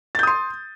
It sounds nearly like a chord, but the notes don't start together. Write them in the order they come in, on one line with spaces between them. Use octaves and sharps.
A6 G6 D#6 C6